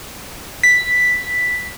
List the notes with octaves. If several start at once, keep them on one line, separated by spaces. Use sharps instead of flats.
B6